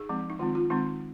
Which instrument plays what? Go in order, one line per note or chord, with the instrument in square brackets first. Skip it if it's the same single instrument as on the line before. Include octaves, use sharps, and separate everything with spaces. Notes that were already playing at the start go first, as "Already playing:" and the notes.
Already playing: [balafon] D#4 G#4
F3 G#3 C4
D#4
D#3 G#3 C4 F4
F4
D#3 G#3 C4 D#4